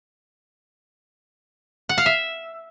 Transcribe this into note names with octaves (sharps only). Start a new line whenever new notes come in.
F#5
F5
E5